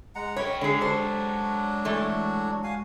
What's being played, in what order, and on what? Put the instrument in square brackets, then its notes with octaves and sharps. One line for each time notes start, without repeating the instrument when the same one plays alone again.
[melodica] G#3 F#5 A#5
[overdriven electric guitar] F#2 G5 [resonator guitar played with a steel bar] C#5 [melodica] B5
[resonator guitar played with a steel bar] D3 G#4 [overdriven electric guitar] G#3 G4 [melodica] G#5
[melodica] F#3 D4 F#4 [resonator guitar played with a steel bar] A4 C5
[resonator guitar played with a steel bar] E3 A3
[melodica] F#4 F5 G#5